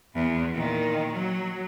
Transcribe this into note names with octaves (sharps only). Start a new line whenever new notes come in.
E2
A#2 D#3
F#3